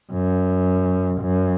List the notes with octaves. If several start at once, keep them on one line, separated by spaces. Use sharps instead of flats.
F#2
F#2